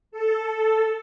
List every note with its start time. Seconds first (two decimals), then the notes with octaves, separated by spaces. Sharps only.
0.12 A4